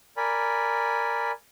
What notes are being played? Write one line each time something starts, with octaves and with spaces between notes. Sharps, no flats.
A#4 D5 G#5 B5